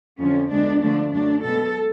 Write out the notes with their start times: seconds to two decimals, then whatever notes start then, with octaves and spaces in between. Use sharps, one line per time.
0.19 F2 D3 F3 C#4
0.51 D2 D3 G#3 B3 D4
0.82 D2 D3 F3 A3 D4
1.13 F#2 D3 F#3 A3 D4
1.45 B2 G#3 B3 A4